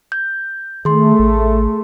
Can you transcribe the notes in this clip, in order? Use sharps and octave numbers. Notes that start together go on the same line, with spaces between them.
G6
D#3 A3 G#4 C6
A1